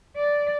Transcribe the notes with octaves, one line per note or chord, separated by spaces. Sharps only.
D5